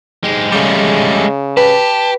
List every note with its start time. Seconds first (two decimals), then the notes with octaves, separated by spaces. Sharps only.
0.24 G#2 G#3 G4
0.52 C#3 G3 A3
1.57 G4 B4 A5